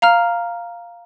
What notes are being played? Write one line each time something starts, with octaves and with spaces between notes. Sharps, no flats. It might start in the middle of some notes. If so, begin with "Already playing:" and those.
F5 A#5 F6